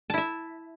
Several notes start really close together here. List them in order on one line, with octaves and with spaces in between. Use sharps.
A5 E4 E5